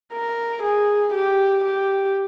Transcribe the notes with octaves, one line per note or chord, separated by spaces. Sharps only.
A#4
G#4
G4
G4